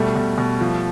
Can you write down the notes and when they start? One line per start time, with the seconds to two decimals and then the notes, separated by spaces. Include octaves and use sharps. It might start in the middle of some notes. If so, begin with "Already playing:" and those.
Already playing: B2 G3 A3
0.16 B2
0.38 B2
0.61 F3